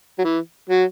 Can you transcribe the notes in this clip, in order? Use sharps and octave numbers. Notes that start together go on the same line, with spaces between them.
F#3
E3
F#3